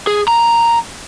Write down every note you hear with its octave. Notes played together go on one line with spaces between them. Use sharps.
G#4
A#5